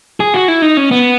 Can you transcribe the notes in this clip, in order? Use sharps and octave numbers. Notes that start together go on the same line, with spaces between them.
G#4
F#4
E4
D#4
C#4
B3